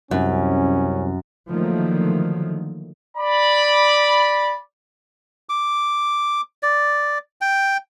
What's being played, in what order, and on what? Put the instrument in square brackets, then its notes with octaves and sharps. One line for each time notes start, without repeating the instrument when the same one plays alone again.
[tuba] C2 [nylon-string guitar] F#2 [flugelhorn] C#4
[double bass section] D3 D#3 F3 F#3 A3 A#3
[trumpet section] D5 B5
[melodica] D6
D5
G5